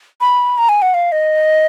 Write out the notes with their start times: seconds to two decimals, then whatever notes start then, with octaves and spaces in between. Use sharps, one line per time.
0.21 B5
0.58 A#5
0.69 G#5
0.82 F#5
0.94 F5
1.12 D#5